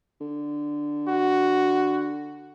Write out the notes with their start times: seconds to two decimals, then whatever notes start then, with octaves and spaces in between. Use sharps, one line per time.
0.21 D3
1.08 F#4